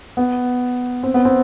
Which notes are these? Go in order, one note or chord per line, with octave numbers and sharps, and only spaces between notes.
B3
C4
B3
C4